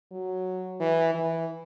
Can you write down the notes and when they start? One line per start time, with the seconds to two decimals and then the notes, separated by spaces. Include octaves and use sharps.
0.12 F#3
0.80 E3
1.14 E3